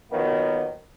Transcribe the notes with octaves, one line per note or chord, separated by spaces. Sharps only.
D#3 F3 F#3 A#3 B3 F#4